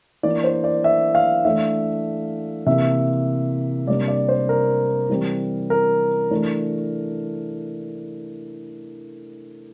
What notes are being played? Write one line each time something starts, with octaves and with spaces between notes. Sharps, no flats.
E3 A#3 D4 D5
C5
D5
E5
F5
E3 A3 D4 E5
C3 E3 A#3 E5
C3 G3 A#3 D4 D5
D5
C5
A#4
E3 G3 C4
A#4
E3 A3 D4